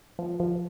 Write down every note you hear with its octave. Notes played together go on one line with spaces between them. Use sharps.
F3
F3